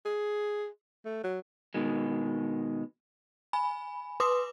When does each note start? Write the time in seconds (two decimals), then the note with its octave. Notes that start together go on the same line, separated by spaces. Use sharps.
0.06 G#4
1.05 A3
1.24 F#3
1.74 B2 D#3 G#3
3.53 G#5 B5
4.20 B4 C6 D6 D#6